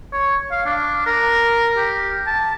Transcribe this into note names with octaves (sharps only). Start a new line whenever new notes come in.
C#5
F5
D4
A#4
G4
A5